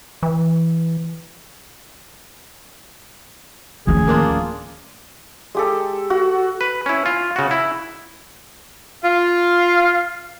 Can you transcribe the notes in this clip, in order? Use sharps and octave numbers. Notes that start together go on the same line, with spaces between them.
E3
D1 D#3 F3 A3 C#4 G#4
A#3 D4 F4
G#3 G4 A4
F#4
B4
C#4 E4
F4
C#3 F#4
E4
F4 F5